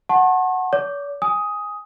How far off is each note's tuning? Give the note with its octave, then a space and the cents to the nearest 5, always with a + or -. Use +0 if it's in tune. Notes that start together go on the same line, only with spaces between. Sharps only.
F#5 +0 A5 -5 C#6 -45
C#5 +45 D6 +15
G#5 -10 D#6 +10